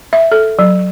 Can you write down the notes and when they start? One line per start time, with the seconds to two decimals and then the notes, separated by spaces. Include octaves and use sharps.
0.13 E5
0.32 A4
0.59 F#3